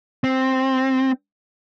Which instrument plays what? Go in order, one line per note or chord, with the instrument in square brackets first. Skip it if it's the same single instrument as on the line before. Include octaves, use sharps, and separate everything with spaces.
[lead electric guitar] C4